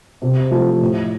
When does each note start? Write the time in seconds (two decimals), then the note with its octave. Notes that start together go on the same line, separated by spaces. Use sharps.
0.22 C3
0.51 F3 A3
0.81 A2